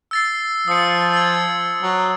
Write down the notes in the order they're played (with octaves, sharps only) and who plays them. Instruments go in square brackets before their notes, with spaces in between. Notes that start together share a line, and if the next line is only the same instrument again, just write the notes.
[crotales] E6 A6 C7
[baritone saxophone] F3 [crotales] D#6 C#7
[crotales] E6 G#6
[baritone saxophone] F#3